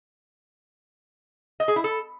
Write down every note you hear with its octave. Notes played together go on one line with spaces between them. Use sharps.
D#5
G#4
E4
A4